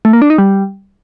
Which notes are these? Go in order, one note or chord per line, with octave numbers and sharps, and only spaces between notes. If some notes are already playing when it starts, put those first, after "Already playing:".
A3
A#3
D4
D#4
G3